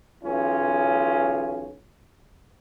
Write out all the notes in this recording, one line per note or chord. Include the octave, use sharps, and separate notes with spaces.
B1 E2 C#4 F4